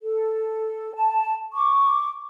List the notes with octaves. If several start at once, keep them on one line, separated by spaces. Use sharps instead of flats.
A4
A5
C#6 D6